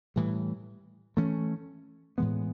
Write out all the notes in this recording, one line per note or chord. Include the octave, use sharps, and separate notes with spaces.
A2 E3 G3
E3 A3 C#4
A2 E3 G#3 B3